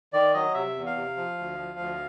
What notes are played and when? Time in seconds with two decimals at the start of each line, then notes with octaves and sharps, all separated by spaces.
0.13 D#3 D5
0.34 F#3 D#5
0.54 C3 E5
0.76 E2
0.86 F5
0.96 C3
1.17 F3
1.38 D2
1.59 F3
1.79 D2